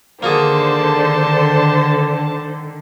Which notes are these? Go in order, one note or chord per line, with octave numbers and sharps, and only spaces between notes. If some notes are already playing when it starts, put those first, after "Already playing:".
D3 D#3 A#3 F#4 G#4 C5 D5 A5